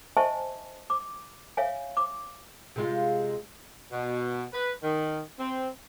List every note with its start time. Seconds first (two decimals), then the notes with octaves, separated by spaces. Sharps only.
0.17 C5 D#5 E5 G#5 A5 C#6
0.90 D6
1.57 C#5 E5 F5 G#5
1.97 D6
2.76 C3 G#3 F4
3.92 B2
4.53 B4
4.83 D#3
5.39 C4